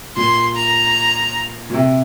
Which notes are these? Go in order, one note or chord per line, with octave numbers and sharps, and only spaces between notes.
A#2 C6
A#5
A#2
C3